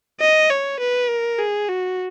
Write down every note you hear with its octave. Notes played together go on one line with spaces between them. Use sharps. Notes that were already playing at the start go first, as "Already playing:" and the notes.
D#5
C#5
B4
A#4
G#4
F#4